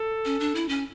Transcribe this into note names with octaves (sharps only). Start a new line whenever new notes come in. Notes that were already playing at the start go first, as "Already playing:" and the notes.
Already playing: A4
C#4
D4
E4
C#4